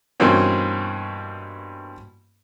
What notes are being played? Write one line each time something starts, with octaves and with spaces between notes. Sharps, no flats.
G2 B2 E3 A#3 C4 C#4